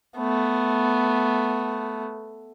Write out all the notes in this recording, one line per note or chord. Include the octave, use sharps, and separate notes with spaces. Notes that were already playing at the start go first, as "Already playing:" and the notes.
A3 B3